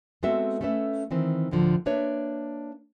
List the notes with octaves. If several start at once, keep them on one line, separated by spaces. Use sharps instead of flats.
G#3 B3 C4 F#4 A4 E5
A3 C#4 A4 B4 E5
D#3 E3 C4
D2 A2 D3 F3
A#3 D4 B4 C#5 E5